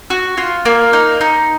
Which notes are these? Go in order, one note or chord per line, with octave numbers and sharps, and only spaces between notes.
F#4
F4
A#3
D#4
D#4